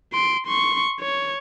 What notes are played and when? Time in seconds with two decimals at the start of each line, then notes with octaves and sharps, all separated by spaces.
0.13 C6 D7
0.47 C6 C#6
1.00 C#5